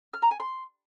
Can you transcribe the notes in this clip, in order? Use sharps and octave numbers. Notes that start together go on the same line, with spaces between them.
F6
A#5
G#5
C6